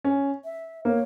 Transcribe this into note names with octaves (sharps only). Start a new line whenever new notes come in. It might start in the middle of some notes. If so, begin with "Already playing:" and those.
C#4
E5
A#3 C#5